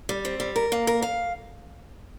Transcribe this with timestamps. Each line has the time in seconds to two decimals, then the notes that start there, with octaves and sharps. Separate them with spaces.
0.09 G3
0.25 C4
0.40 G3
0.56 A#4
0.72 A#3
0.87 A#4
1.02 F5